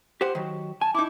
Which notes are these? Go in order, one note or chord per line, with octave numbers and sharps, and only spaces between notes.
G4 C5 F#5
D#3 F#3
G#5 A5
D#4 E4 D6